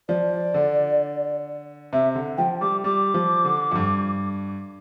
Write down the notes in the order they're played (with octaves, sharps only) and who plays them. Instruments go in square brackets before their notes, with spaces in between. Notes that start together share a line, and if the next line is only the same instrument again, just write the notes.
[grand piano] F3 [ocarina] D5
[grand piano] D3
[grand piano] C3 [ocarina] E5
[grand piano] D3
[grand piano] F3 [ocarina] G5
[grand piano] G3 [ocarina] D6
[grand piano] G3 [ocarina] D6
[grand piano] F3
D3
F2
G2